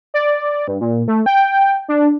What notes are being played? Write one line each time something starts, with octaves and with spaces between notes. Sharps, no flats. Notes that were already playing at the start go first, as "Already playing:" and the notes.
D5
G2
A#2
A3
G5
D4